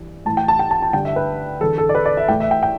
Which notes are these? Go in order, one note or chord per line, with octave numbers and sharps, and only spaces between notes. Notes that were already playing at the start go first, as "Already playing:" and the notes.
Already playing: G2 E3
A2 E3 A5
G5
A5
G5
A5
A5
G2 D3 G5
E5
B4
E2 D3 A4
A4
D5
B4
D5
E5
A2 E3 G5
E5
G5
G5